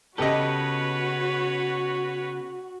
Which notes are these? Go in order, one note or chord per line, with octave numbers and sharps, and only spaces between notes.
C#3 B3 F#4 G4 A4 B4 C#5 D#5